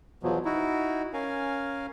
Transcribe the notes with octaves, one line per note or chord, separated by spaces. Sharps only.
E2 B2 F3 F#3
D#4 E4 F#4
C#4 A#4 F5 G#5